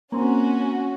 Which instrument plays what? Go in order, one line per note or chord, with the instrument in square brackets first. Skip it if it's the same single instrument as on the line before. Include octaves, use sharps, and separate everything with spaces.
[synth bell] A#3 C4 [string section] C#4 F#4